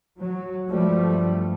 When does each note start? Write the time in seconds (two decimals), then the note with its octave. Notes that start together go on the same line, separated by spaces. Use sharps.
0.18 F#3
0.69 G2 F3 G3 A3